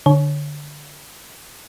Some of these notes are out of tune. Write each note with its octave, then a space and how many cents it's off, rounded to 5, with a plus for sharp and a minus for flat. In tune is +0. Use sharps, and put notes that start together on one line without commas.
D3 +0 C#5 +0